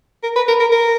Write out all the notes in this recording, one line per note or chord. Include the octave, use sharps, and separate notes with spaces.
A#4
B4
A#4
A#4
A#4